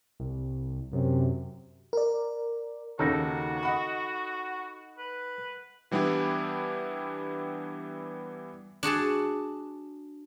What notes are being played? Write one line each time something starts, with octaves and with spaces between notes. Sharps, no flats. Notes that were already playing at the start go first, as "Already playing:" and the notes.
C2
F#2 C3
A#4 D5
D#2 C#3 A#3 D#4 F#4 A4
D#5 F#5 B5
B4
E3 G3 B3 D4 E4 G4
D4 F#4 G#4 A5